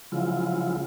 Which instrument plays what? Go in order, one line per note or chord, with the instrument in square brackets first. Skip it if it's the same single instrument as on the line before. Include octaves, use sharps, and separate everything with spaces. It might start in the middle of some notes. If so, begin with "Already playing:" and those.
[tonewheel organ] C#3 F3 F#3 G#3 E4 F4